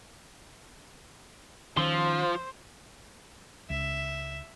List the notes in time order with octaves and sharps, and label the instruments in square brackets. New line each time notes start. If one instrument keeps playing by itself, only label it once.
[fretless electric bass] D#3 C#4 [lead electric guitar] F3 [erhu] C5 [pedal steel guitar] C6 E6
[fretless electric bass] C#2 [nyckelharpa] E5